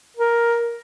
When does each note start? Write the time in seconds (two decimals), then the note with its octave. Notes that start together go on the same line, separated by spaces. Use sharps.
0.17 A#4